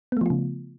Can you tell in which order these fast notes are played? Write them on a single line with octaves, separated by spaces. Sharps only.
B3 A3 F3 F4 C#3